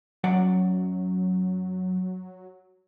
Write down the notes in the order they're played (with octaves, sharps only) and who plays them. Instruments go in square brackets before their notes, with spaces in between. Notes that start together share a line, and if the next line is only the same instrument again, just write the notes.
[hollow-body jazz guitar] F#2 D5 F#5 [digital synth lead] F#3